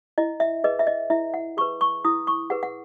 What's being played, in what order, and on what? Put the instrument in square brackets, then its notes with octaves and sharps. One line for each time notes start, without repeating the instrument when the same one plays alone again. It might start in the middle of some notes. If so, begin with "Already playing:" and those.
[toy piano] E4 D#5
E5
G#4 B4 D#5
E5
D#5
E4 E5
F#5
G#4 B4 C#6
C#6
E4 D#6
C#6
G#4 B4 F#5
F#5